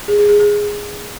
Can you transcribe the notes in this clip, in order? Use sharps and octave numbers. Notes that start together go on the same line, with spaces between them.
G#4
G#4
G#4
G#4